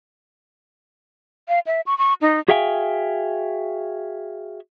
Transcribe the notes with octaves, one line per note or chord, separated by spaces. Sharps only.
F5
E5
C#6
C#6
D#4
F#4 G#4 E5 F5 G5 G#5